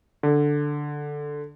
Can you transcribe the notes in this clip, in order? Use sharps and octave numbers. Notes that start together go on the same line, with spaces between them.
D3